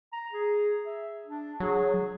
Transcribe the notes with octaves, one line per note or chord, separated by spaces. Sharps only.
A#5
G#4
E5
D4
F#3 G#4